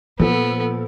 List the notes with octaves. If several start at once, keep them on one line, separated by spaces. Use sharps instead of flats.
A#2 F3 B3 A4